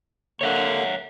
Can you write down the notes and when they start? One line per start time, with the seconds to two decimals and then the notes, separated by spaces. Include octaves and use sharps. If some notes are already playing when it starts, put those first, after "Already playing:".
0.41 D3 A#3 C#5 E5 F#5